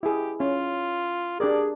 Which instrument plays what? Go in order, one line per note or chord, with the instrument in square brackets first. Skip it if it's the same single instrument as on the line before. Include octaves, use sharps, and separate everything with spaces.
[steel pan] E4 G#4 [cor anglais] G4
[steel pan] C#4 [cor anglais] F4
[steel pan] D4 G4 A#4 [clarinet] G#4 [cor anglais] D5